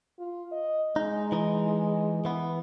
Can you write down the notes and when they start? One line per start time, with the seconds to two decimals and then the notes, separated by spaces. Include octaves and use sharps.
0.19 F4
0.52 D#5
0.96 G#3 D#4
1.32 E3 D#4
2.25 E3 B3